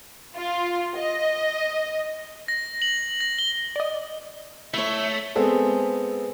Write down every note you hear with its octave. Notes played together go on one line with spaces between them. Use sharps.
F4
D#5
A#6
F#7
A#6
G7
D5 D#5
A3 E4 C#5 C#6
G#3 B3 C4 G#4 A4